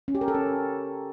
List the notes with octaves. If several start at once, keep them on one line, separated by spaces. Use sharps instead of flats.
C#4
G4
A#4
A4
C#4